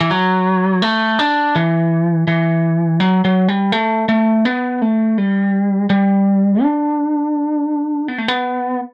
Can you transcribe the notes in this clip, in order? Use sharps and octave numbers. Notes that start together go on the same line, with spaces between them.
E3
F#3
A3
D4
E3
E3
F#3
F#3
G3
A3
A3
B3
A3
G3
G3
D4
B3
A3
B3